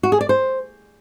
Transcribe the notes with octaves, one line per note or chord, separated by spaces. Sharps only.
F#4
G#4
D5
C5